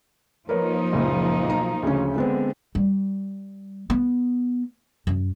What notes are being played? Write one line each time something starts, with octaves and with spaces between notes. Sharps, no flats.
F3 A#3 D#4 A#4 B4 C#5
F#1 C#2 A#2
B1 A#5
D2 C#3 C#4
D3 G#3 B3 C4
G3
B3
F#2